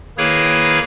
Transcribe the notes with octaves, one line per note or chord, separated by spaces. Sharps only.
D#3 A#3 E4 G#4 B4 C#5